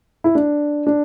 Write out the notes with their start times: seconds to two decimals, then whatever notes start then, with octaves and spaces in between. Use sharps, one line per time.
0.24 E4
0.35 D4
0.87 D4